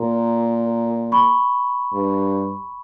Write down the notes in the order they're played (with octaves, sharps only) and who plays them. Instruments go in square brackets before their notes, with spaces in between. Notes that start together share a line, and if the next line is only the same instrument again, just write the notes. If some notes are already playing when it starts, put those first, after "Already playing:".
Already playing: [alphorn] A#2 [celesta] A#5 C6
[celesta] B5 C#6
[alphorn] G2